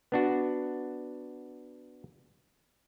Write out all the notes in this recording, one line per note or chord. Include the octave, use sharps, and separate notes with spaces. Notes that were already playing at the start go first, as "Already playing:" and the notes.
B3 D4 F#4